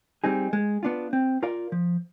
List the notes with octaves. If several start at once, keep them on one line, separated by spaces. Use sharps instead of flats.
G3 C4 D#4 G#4
G#3
B3 D4 F4
C4
F4 A#4 D5 F5
F3